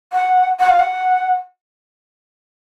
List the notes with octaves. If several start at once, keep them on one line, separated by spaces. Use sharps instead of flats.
F#5
F#5
F5
F#5